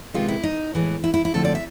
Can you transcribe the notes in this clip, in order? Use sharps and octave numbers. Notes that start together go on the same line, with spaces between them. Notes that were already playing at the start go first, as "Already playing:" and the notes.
C3 D#3 G#3 B3 F4
E4
D#4
A2 E3 G#3 B3
E4
E4
E4
D3 F3 A3 C4 A4
D5
E5